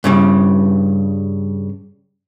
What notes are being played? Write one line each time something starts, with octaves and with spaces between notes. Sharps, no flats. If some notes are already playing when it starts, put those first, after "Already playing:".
G2 C#3 G3